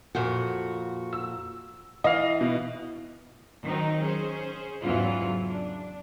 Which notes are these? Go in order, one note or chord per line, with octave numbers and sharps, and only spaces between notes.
F2 A#2 F#4
E6
E3 D#5 F5
B2
D#3 F#3 C4 D#4
C#4 G#4 C5
E2 G#2 C#3 E3 F#3 F4
D4